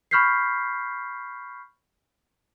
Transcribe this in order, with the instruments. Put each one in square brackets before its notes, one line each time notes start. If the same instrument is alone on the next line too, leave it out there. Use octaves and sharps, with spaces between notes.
[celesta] B5 C#6 F6 G6 B6 C7